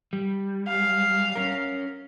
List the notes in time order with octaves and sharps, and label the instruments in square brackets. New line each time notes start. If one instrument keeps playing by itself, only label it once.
[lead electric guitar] G3
[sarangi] F5
[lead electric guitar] C#4 A#4